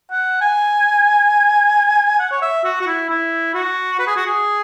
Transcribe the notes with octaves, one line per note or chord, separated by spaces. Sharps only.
F#5
G#5
F#5
C#5
E5
F#4
F#4
E4
E4
F#4
B4
G#4
F#4
G#4